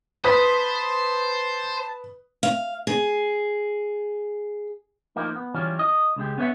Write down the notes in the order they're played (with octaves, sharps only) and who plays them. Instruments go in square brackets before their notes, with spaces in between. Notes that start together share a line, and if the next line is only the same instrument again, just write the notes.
[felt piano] B4 [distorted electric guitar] C5 [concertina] A5 [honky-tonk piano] D#6 B6
[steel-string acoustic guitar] F5
G#4
[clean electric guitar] F3 A#3 D#4
B3
E3 F#3 G3 C#4 F4
D#5
C#2 C#3 G#3 G4
B3 C#4 B4 C5 E5 F#5